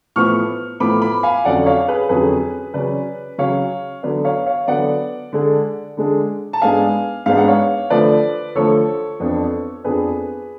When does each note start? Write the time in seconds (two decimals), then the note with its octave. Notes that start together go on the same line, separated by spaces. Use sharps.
0.16 A2 F3 B3 C#6 F6
0.80 A2 F3 B3 B5 D6
1.02 B5 D6
1.23 F5 G#5
1.45 F2 D3 F#3 C#4 D5 F#5
1.66 C#5 F5
1.88 G#4 B4
2.09 F2 D3 F#3 C#4 G#4 B4
2.74 C#3 F#3 C#4 B4 D5
3.38 C#3 F#3 C#4 C#5 F5
4.03 D3 F#3 B3 B4 D5
4.25 C#5 F5
4.46 C#5 F5
4.67 D3 F#3 B3 D5 F#5
5.33 D3 G#3 D4
5.97 D3 G#3 D4
6.53 A5
6.61 G#2 G#3 B3 D4 F5 G#5
7.26 G#2 G#3 B3 D4 F5
7.37 F#5
7.48 C#5 F5
7.90 D3 F3 A3 B4 D5
8.55 D3 F3 A3 A4 C#5
9.20 F2 F3 B3 D4
9.84 F2 F3 B3 D4 G#4 B4